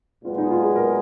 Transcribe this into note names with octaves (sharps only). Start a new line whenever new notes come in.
B1 A#2 G#3 B3 F4
D#4
F4
G#4
A#4